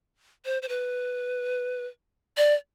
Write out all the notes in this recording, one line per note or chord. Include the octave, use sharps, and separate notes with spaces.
C5
C5
B4
D5